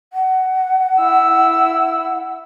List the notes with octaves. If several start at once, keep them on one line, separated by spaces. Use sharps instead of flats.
F#5
E4 E6